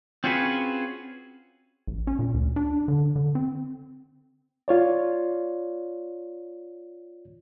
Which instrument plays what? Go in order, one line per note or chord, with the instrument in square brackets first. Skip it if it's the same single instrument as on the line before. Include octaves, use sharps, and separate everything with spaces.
[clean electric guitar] C4 C#4 F4 F#4 G#4 B4
[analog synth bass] A1
C#4
A#2
D2
D4
D3
D3
C4
[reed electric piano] F4 C#5 D5